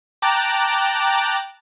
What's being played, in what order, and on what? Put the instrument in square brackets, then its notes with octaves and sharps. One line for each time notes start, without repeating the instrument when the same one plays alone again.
[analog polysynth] G5 A5 A#5 D6 F#6